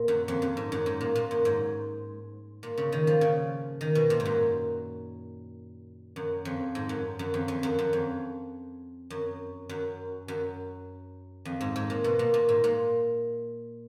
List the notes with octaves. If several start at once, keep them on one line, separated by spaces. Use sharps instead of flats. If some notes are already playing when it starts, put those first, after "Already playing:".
Already playing: A#2
F#2
F2
F#2
G#2
F#2
G#2
A#2
A#2
F#2
G#2
A#2
C#3
D#3
F3
C#3
D#3
B2
A#2
G#2
F#2
F#2
F2
G#2
F#2
F#2
F2
F2
F#2
F#2
F2
F#2
F#2
F#2
F2
G#2
G#2
A#2
B2
A#2
A#2
G#2
A#2